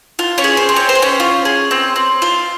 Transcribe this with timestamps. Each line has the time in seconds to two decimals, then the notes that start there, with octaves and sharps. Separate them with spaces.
0.19 F4
0.38 C#4 C#5
0.44 G#4
0.57 C5
0.69 C4
0.76 C#5
0.89 C5
0.95 C4
1.02 C#4 C#5
1.20 F4
1.45 G#4
1.71 C4
1.96 C4
2.22 F4